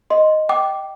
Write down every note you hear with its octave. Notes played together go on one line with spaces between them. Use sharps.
D#5 C6
G5 D6